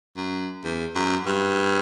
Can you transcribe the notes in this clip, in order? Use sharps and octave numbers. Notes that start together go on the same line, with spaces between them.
F#2
E2
F#2
G2